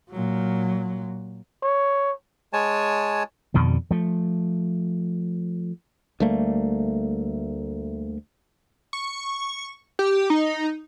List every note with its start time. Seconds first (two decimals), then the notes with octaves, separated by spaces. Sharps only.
0.10 A#2 F#3
1.63 C#5
2.53 G#3 C#5 G#5 A5
3.54 F2 B2 D3 D#3
3.91 F3 A3
6.20 D2 G3 A3 A#3
8.93 C#6
9.99 G4
10.30 D#4